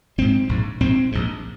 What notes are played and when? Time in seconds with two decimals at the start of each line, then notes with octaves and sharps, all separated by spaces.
0.18 A#1 G#2 C4
0.49 A#1 G#2
0.80 A#1 G#2 C4
1.12 A#1 G#2